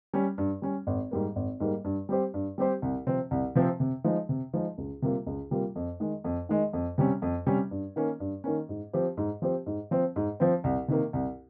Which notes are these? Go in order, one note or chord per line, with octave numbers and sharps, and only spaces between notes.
G3 C#4
G2
G3 C#4
G#1
G#2 G3 A#3
G#1
G#2 G3 A#3
G2
G3 C4 G4 C5
G2
G3 C4 G4 C5
C2
C3 F3 C4
C2
C3 F3 C4
C3
F3 G#3 D#4
C3
F3 G#3 D#4
C#2
C3 G3 A#3 F4
C#2
C3 G3 A#3 F4
F2
D#3 G#3
F2
D#3 G#3
F2
C3 G3 C#4
F2
C3 G3 C#4
G2
D#3 A#3 C#4
G2
D#3 A#3 C#4
G#2
F3 C4 G4 C5
G#2
F3 C4 G4 C5
G#2
F3 C4
G#2
F3 C4
C2
C3 D#3 A#3
C2